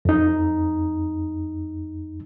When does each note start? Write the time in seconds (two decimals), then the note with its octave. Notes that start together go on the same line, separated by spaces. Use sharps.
0.05 F2 D#4